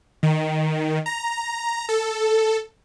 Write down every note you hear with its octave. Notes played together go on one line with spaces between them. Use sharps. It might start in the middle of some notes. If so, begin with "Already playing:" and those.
D#3
A#5
A4